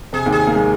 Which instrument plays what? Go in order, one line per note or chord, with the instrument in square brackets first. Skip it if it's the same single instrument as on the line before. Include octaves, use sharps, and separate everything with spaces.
[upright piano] C3 [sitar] G#4
[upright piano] D#2 D#3
[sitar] G#4
[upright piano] A#3
G#3